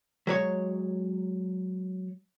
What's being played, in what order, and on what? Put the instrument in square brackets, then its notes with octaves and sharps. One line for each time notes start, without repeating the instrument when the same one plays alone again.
[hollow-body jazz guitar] F#3 G#3 C#5